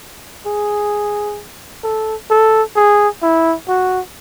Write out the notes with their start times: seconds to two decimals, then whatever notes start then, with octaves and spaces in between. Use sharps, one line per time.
0.46 G#4
1.84 A4
2.31 A4
2.76 G#4
3.23 E4
3.68 F#4